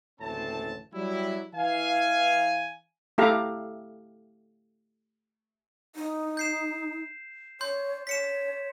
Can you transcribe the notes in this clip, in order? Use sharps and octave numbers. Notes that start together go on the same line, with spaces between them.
F#1 D2 A2 E3 C4 A5
F#3 G3 E4
E3 F5 G#5
A3 E4 G4 A4 F5 A#5
D#4
G6 C7 E7
C#5 C6 G6
C#5 B6 C#7 E7